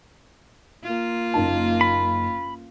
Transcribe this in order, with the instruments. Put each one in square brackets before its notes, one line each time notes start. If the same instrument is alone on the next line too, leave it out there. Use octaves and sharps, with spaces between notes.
[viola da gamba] A#3 F4
[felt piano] F#1 D#4 A5
[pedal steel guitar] B5